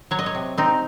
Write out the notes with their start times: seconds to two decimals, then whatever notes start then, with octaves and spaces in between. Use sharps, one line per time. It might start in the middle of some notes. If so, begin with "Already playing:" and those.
0.11 F#3 C#5
0.19 D#5
0.26 C#5
0.35 C3
0.58 C4 D#4